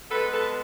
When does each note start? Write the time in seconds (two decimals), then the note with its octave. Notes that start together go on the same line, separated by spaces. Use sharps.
0.10 B2 G#3 B3 A4 B4
0.32 A4 B4